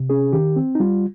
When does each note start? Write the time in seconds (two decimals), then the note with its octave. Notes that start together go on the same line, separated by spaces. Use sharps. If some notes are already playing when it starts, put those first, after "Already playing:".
Already playing: C3
0.10 C#4 G#4
0.33 D#3 G4
0.56 C4
0.75 D#4
0.80 G3 F4